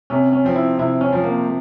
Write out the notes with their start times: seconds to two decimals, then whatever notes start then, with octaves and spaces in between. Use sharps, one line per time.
0.10 C3 C#4
0.33 C#4
0.44 F3 C4
0.56 E4
0.79 C3 E4
1.01 C#4
1.12 F3 C4
1.24 A#3